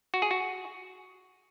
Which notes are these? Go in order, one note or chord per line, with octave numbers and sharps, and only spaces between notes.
F#4
G#4
F#4